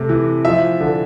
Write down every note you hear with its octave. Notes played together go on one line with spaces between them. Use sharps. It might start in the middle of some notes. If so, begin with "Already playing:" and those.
Already playing: C3 A3
E3
F3 E5
D3